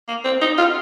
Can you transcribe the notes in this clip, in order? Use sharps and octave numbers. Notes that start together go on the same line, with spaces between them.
A#3
C4
D#4
F4